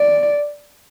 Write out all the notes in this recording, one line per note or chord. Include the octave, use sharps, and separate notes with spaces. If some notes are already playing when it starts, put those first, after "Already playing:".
Already playing: D5